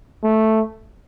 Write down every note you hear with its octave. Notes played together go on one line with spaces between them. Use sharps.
A3